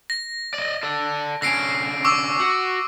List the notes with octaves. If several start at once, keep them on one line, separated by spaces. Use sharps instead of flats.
A#6
D5 D#5
A4 D5
D3 C#4 A#6 C7 D7
C#6 D6 E6
F#4